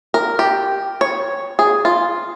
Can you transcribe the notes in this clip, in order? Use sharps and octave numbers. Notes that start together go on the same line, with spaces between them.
A#4
G4
C#5
G#4
F4